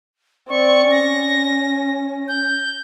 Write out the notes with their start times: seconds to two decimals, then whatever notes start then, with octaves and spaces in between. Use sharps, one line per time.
0.49 C4 D5 C#6
0.91 C#4 A#6
2.28 G6